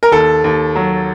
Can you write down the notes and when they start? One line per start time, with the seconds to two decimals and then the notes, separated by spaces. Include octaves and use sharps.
0.03 A#4
0.11 D#2 A4
0.44 D#2
0.75 F#3